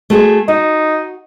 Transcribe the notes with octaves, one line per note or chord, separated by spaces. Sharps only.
A3 F#4 G#4
D#4 F#4